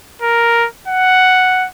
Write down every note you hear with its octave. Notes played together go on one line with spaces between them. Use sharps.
A#4
F#5